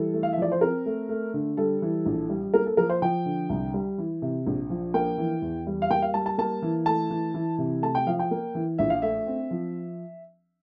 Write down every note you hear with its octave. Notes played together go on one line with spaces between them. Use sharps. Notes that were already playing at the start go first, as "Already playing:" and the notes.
Already playing: E3 G3 A4
A3
F5
E5
F3 D5
C5
C4 A#4
A3
A3
D3
G3 A4
E3
A#1
G3
A#3 A#4
A4
F3 A#4
C5
F3 G5
D3
C2
G3
E3
C3
A#1
F3
A#3 G5
E3
E2
G3
F5
A#3 G5
F5
G3 A5
A5
A#3 A5
E3
A3 A5
E3
E3
C3
A3 A5
G5
F3 F5
G5
A#3
E3
A#1 E5
F5
A3 E5
C4
F3